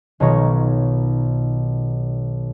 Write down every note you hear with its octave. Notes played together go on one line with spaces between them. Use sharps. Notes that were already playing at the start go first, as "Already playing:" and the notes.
B1 B2 D#3 F4 C#5 A#5